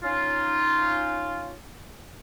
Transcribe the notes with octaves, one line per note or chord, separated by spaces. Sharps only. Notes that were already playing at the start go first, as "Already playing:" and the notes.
C#4 D#4 F4